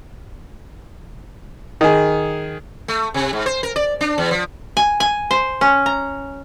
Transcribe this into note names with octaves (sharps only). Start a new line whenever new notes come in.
D#3 G#4
A3
C3
G#2
C5
A#4
D5
D4
E2
F3
G#5
G#5
C5
C#4
A#5